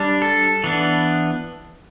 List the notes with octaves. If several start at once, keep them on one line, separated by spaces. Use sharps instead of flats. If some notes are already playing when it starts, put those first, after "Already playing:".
Already playing: G3 D4
A4
E3 B3 D4